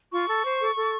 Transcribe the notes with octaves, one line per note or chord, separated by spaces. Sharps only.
F4 C#6
A4
C5
A4
A4